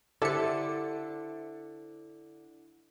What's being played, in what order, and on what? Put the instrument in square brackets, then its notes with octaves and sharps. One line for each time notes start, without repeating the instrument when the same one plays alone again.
[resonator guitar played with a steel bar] D3 [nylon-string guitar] E4 C5 [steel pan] G4 D5 E5 [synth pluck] A4 C#7